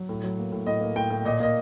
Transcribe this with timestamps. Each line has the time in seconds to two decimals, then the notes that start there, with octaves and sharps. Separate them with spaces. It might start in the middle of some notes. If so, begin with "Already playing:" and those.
Already playing: F#3
0.09 A2
0.24 F#3
0.38 A#3
0.52 A2
0.66 A2 D#5
0.81 A#3
0.96 A2 G5
1.10 A2
1.25 A#2 D#5
1.40 A#3 D#5